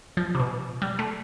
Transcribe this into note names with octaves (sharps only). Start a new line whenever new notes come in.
F3
C3
B2
G3
A3